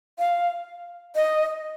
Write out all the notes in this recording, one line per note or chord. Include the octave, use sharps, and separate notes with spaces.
F5
D#5